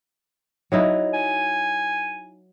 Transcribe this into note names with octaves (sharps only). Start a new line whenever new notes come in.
F#3 D#4 E4
G#5